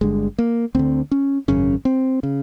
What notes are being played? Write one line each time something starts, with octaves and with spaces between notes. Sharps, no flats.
G1 G2 D3 G#3
A#3
D2 D3 C4
C#4
G#1 F#2 C#3 C#4
C4
C#3